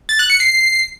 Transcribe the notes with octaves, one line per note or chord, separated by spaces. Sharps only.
A6
F#6
C#7
C7